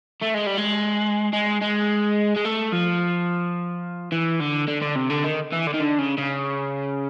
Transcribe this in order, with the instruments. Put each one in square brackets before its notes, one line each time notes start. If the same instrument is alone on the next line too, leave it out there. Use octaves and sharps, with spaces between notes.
[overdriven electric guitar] A3
G#3
G3
G#3
G#3
G#3
G#3
A3
F3
E3
D3
D3
D3
C3
D3
D#3
E3
D3
D#3
D3
C#3
C#3